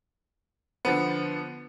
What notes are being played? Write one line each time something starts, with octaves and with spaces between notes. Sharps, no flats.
D3 F3 B3